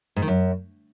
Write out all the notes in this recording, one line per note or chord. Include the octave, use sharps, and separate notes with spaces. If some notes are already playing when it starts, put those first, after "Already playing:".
G#2
D#3
F#2